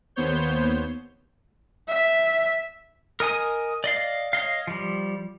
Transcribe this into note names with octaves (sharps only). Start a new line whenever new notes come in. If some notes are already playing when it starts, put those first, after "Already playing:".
D#2 B3 C5 C#5 G6
E5
A#4 D#5 G#5 D#6
D5 D#5 F5
C#5 D#5 F5
F3 G3